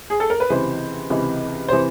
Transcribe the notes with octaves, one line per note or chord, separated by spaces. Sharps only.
G#4
A4
A#4
B4
C#2 C3 E3 C5
C#2 C3 E3
C3 E3 C5